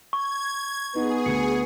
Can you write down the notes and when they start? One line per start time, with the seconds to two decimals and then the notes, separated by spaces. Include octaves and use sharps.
0.13 C#6 G#6
0.95 B3 D#4 G#4
1.26 D2 C#7